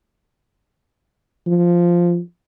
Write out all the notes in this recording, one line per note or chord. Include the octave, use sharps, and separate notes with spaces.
F3